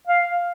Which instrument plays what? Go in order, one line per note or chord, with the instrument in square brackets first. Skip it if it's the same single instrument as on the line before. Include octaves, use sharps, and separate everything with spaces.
[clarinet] F5